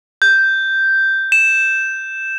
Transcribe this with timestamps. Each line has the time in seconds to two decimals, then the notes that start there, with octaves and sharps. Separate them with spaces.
0.22 G6
1.32 E7